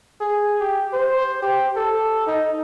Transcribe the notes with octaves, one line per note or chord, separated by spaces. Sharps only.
G#4
G4
C5
G4
A4
D#4